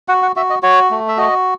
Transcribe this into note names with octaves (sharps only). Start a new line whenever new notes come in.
F#4 F#5
F#5
F#4 E5
D#5
F#4 C#5
A3
E5
F#4 D#5